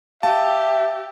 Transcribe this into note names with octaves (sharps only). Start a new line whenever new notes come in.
G4 E5 F5 A5